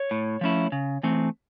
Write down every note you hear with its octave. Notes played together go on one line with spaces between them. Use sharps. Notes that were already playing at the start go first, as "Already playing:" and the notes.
Already playing: C#5
A2
F3 A3 C#4 E4
C#3
E3 A3 C4